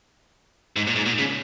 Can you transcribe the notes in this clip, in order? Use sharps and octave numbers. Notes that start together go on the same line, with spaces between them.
G#2
A#2
G#2
A#2
C#3